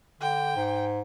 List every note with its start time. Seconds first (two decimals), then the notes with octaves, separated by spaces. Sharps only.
0.21 D3 G5
0.56 G#2